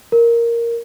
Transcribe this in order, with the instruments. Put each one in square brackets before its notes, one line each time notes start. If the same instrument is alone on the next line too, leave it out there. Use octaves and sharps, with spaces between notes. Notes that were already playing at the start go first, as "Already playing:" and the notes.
[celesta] A#4